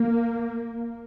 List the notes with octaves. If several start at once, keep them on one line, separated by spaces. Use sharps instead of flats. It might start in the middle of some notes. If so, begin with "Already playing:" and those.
Already playing: A#3